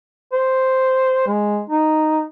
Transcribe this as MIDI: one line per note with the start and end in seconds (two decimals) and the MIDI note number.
0.33 1.22 72
1.27 1.61 56
1.70 2.23 63